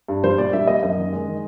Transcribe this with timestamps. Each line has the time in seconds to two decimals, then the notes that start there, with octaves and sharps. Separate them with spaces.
0.08 G2
0.24 G3 C5
0.38 A#2 D5
0.53 G3 E5
0.67 A#2 D#5
0.83 F#2 D#5
0.98 D#3
1.13 G#3
1.27 D#3